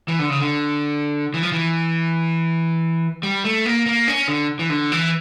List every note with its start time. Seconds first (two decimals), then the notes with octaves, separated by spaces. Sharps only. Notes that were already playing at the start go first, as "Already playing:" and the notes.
0.08 E3
0.19 D3
0.29 C#3
0.39 D3
1.34 E3
1.43 F3
1.52 E3
3.23 G3
3.44 A3
3.65 A#3
3.86 A#3
4.08 C#4
4.28 D3
4.59 E3
4.70 D3
4.92 E3